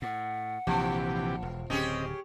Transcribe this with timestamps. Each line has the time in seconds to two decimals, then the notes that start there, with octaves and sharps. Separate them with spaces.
0.02 A2 F#5
0.67 A#1 C3 E3 F3 G4
1.42 E1
1.70 D1 C#3 C4 C#4 G4 G#4 D#5